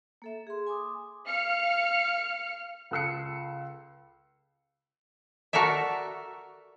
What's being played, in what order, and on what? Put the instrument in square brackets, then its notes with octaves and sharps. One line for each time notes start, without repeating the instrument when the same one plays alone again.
[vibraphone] A#3 A4 E5
G#4 C6
G#5 C6 D6 D#6
[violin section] F5 F6 C#7
[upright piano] C#2 A4 E6 C7 C#7
[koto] F#4 A4 A#4 D5 E5